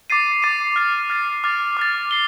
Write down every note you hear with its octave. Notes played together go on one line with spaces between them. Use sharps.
D6 A6 C7 D#7
D6 A6 C7 D#7
F6 A6 C7
F6 A6 C7
D6 F6 A6
D6 F6 A6
C7 G7